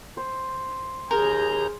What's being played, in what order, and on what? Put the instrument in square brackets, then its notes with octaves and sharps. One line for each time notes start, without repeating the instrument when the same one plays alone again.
[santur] C5
[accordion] D#2 A#5 G6 [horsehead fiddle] G#4 [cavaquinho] A#4